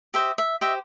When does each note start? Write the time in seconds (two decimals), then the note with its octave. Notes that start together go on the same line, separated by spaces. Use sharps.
0.14 G4 C5 D#5 E5
0.38 E5
0.61 G4 C5 D#5 E5